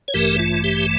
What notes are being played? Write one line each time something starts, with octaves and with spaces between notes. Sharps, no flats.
C#5
A1 G2 E3 A3 G4 A#4
F4
G4